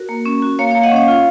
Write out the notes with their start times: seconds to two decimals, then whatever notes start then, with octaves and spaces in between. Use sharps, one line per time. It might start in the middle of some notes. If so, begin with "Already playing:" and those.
Already playing: F#4 A#4
0.09 A#3
0.26 C#4
0.42 F#4
0.59 A#3 C#5 F5
0.71 A#3 C#5 F5
0.83 D#5 F#5
0.92 C#4 C#5 F5
1.08 F4